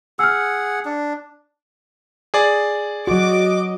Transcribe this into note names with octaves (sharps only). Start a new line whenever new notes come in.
G#4 F#5 E6 F6
D4
G#4 D5
F#3 F#4 D#5 D6